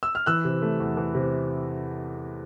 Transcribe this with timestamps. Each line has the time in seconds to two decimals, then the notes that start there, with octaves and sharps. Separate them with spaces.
0.03 E6
0.15 F6
0.26 E3 E6 F#6
0.45 C3
0.62 A3
0.80 E2
0.97 E3
1.15 C3